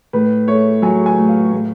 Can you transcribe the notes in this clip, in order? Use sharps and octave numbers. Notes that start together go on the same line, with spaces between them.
A2 B4
A3 C#5
F#3 G#5
G#5
A2
F5
A2